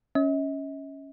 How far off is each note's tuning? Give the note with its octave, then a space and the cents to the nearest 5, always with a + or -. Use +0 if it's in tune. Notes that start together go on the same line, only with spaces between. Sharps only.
C#4 +0 D#5 +45